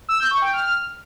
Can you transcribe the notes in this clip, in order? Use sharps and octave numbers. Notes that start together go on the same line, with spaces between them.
E6
G6
C#6
G5
F6